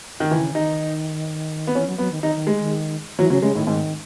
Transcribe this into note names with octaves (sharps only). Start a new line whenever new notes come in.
D#3
C#3 E3
D#3 D#4
B3
E3 C#4
F#3
F#3 B3
D#3
D#3 D#4
D#3
G#3
D#3
E3 F#3
C#3 F#3
C#3 G#3
A2 D#3
G#2 D#3